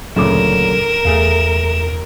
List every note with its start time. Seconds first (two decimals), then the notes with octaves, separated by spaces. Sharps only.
0.16 D2 A#2 C#3 F#3 A4 A#4 D6 E7
1.05 E2 A3 G#4 F5